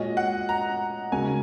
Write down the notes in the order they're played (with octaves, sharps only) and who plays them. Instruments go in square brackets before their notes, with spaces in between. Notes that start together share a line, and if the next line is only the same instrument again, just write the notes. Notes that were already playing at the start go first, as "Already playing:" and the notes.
Already playing: [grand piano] A#2 G#3 F#4 C#5 [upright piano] D#5
[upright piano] F#5
A#5
[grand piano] C#3 G#3 F#4 A#4 [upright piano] G#5